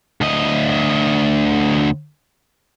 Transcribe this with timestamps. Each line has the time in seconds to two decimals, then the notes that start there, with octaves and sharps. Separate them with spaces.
0.21 D2 D#5